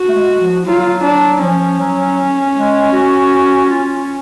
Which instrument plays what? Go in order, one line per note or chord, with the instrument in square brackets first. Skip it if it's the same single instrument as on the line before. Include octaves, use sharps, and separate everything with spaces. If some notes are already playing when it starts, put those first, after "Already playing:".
Already playing: [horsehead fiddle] F#4
[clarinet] A3
G#3
F3
[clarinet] F#3 [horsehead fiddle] F4
[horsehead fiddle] D4
[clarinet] F3 [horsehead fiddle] C#4
[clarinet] F#3
G#3
F#4
F4